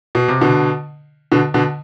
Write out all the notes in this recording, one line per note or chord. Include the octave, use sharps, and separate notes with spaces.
B2
C3
B2 D3
B2 D3
B2 D3